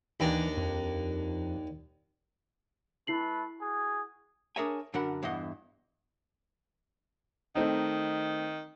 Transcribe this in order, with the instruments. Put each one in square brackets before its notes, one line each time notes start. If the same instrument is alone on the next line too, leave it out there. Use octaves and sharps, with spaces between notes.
[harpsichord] D#2 D4 A#5 [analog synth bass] E3
[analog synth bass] F2
[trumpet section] A3 B4 [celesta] E4 C7 F#7
[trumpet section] F#4 G#4
[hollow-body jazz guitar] D4 G#4 A#4 C#5 E5 G#5
F#2 D3 D4 A#4 F#5 B5
E2 G2 E4 D#5 F#5
[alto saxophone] D#3 [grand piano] A3 C4 D#4